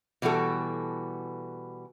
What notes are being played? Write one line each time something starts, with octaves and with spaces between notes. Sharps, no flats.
B2 E3 G3 F#4 A4